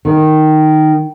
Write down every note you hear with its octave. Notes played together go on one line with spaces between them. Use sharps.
D#3